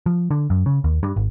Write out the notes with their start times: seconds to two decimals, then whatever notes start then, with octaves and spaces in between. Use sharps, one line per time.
0.06 F3
0.31 D3
0.50 F#2
0.66 C#3
0.84 D#2
1.03 G2
1.16 G#1